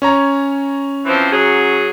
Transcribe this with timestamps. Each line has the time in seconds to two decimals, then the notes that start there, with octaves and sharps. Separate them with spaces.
0.02 C#4 C#5 A#5
1.06 E3 F3 C4
1.31 F#3 G#4